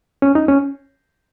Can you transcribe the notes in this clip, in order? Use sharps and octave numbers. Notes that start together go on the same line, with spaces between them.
C#4
D#4
C#4